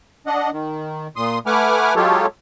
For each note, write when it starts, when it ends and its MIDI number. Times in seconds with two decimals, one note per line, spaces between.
0.27 0.50 62
0.27 0.50 75
0.27 0.50 78
0.52 1.08 51
1.16 1.39 46
1.16 1.39 84
1.16 1.39 87
1.46 1.94 57
1.46 1.94 71
1.46 1.94 78
1.46 1.94 80
1.46 1.94 86
1.46 1.94 89
1.96 2.26 54
1.96 2.26 56
1.96 2.26 65
1.96 2.26 67
1.96 2.26 69
1.96 2.26 73